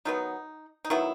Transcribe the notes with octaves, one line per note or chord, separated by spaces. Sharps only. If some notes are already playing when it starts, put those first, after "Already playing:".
D#3 F#3 B3 D#4
D#4
D#3 F#3 B3 E4